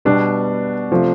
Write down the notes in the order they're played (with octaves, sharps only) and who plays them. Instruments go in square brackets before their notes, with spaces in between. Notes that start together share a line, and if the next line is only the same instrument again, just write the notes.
[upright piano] B2 G3 B3 D4
C3 F3 A3